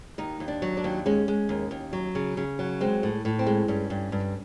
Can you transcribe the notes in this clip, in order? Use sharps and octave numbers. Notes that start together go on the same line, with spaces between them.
D#2 D#4
D#2
D4
F#3
D4
D#2
G#3 C#4
G#3
D#2
D#2
F#3
C#3
C#3
F#3
G#3 C4
A2
A2
C4
G#3
G2 C#4
G2
G2